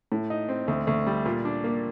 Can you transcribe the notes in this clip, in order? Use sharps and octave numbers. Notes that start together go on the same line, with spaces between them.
A2
D#4
C4
D2
D2
G3
A#2
D4
A#3